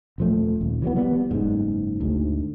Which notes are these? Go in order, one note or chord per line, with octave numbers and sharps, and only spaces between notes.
D#1 F3 A3
D#1
E3 F#3 G#3 B3
G3 B3
F#1 G#2
D2 G#2